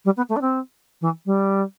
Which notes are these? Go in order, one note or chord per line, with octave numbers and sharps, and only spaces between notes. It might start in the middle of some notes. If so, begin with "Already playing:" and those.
G3
B3
A3
D4
C4
E3
G3